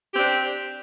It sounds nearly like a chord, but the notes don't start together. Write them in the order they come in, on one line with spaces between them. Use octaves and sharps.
G4 C4 D4